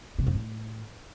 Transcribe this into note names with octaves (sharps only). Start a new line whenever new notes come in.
C3
F2
A2